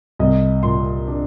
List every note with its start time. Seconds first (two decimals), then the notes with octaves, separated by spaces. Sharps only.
0.19 C2 D#5
0.63 A#2 C6
1.07 D4